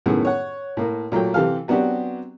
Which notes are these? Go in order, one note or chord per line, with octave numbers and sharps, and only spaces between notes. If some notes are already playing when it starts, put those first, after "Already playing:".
F#2 A2 D#3 B3 G#4
C#5 F#5
A2 A#3
A#2 F#3 A3 G5
C3 E3 G4 A4 F5
F#3 B3 C4 D4 F#4 G4